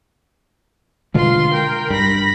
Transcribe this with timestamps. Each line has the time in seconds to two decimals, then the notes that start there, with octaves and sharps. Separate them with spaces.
1.14 B2 D3 G#3 F4 C6
1.53 A#4 G5
1.90 G2 B5 A#6